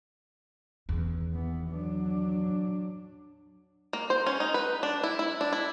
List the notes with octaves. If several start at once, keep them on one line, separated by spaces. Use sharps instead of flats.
E2 D#3
E3 B3
F#3 D4
A#3
C5
C#4
D#4
B4
D4
E4
E4
D4
E4